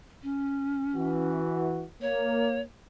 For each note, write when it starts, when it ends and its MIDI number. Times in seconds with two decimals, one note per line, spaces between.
0.23 1.38 61
0.94 1.85 52
0.94 1.85 66
2.01 2.63 58
2.01 2.61 73